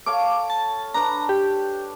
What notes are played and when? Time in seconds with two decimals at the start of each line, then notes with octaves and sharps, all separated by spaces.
0.06 A4 C#5 F5 D6
0.50 A5
0.94 D4 B4 A#5
1.29 G4